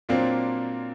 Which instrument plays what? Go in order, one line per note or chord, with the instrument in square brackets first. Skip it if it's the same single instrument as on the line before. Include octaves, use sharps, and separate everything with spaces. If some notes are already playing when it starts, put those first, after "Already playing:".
[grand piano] A#2 F#3 A#3 D4 F4 [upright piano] C4